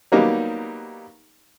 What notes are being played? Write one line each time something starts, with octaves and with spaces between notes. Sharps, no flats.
F#3 G3 A#3 B3 D#4 G4